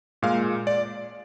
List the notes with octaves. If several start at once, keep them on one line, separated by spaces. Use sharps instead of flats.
A#2 G#3 F5
D5